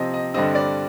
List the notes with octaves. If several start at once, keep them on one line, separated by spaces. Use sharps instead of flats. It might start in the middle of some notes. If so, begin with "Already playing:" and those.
Already playing: C3 F3 C4 D#5
D#5
G2 D3 G3 C4 D#5
D5